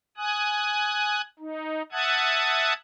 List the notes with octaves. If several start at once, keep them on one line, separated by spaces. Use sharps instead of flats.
G#5 D#6 F#6
D#4
E5 F#5 A5 D#6 F#6 G#6